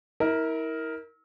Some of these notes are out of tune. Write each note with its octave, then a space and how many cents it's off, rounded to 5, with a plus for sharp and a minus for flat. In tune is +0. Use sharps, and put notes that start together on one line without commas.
E4 -35 A#4 +0